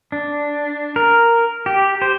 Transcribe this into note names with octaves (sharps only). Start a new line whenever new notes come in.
D4
A#4
G4
C5